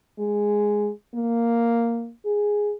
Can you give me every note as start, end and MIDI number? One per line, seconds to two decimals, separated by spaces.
0.18 0.90 56
1.15 2.11 58
2.25 2.73 68